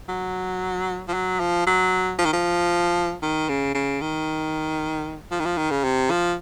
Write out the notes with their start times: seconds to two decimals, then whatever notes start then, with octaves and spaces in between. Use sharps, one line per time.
0.09 F#3
1.08 F3
1.14 F#3
1.40 F3
1.67 F#3
2.18 F3
2.25 D#3
2.33 F3
3.22 D#3
3.49 C#3
3.75 C#3
4.01 D#3
5.31 F3
5.40 D#3
5.45 F3
5.58 D#3
5.71 C#3
5.84 C3
6.10 F3